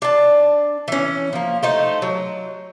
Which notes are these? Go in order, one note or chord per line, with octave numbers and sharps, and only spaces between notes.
D4 A5
E3 C#4
F3 A#3
A3 D#4 C5
F#3